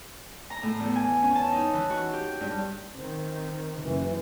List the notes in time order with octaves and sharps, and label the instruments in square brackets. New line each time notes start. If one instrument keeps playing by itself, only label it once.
[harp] A#5
A2
E2
G#5
C#4
A5
D#4
E3
F#4
G4
G2
[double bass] D#3 C4
[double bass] F#1 [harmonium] E3